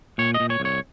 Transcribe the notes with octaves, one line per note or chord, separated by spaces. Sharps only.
A#2 C#5
D#5
A#2
C#5
C2
C#5